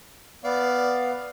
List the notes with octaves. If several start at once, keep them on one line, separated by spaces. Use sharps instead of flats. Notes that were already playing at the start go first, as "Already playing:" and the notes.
B3 D5 F5